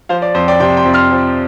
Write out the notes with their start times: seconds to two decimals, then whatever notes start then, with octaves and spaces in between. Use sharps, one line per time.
0.09 F3 C5 F5
0.22 D5
0.34 F2 C5
0.48 D5 G5
0.60 C3 G5 C6
0.77 G5 C6
0.85 F2
0.94 C6 F6
1.11 F3